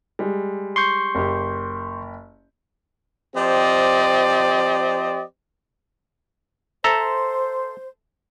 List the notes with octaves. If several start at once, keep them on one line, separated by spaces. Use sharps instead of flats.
G3 G#3
C6 C#6 G6
F#1 G4
F3 C4 G4 C5 D5 D#5
A4 C5 E5 A#5